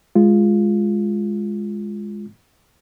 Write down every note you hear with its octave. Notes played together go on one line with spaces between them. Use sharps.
G#3 F4